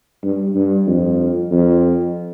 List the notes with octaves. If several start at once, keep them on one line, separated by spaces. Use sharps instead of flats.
G2
G2
F2
F2